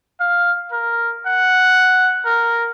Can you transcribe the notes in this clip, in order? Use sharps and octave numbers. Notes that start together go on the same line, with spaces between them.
F5
A#4
F#5
A#4